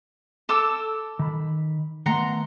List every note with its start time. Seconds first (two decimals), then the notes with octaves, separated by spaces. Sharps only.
0.49 A4 D6 E6
1.19 D#3 B5
2.06 D#3 A3 B3 F#5 A#5 C6